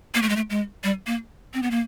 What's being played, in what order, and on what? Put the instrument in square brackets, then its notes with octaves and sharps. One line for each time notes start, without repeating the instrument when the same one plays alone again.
[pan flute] A#3
A3
G#3
A3
G#3
G3
A#3
C4
B3
A#3